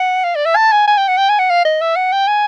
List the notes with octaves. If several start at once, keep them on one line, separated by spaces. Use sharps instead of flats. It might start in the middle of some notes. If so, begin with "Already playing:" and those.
Already playing: F#5
F5
D5
E5
A5
G#5
G#5
G5
F#5
G5
G#5
F#5
F5
D#5
E5
F#5
G5
G#5